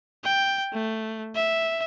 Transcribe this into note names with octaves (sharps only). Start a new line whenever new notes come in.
G5
A3
E5